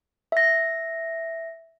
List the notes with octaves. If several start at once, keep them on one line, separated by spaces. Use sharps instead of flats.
E5 A#6